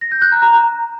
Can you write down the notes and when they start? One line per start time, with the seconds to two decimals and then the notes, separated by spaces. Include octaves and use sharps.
0.01 A#6
0.12 G6
0.22 F#6
0.32 A#5
0.42 A#5